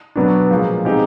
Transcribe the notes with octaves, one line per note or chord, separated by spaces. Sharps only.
B2 F#3 B3 D4
A#2 F3 G#3
B2 G#3 C4 D#4 G4